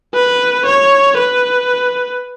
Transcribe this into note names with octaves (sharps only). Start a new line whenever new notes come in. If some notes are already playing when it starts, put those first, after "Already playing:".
B4
C#5
B4